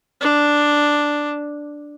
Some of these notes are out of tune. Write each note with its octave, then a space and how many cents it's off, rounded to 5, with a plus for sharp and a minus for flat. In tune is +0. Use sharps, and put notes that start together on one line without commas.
D4 +0